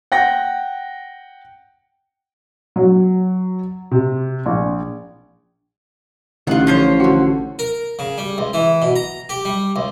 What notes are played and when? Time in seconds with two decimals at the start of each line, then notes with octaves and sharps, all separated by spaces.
0.12 F#5 G5 A#6
2.76 F#3
3.91 C3
4.46 A#1
6.47 A1 D3 D#3 G3 F4 F#5
6.67 F3 C5 C#5
7.00 D3 F#4
7.59 A#4
7.99 C#3
8.18 G3
8.38 C#2
8.53 E3
8.82 B2
8.96 A#5
9.29 G4
9.45 G3
9.76 C#2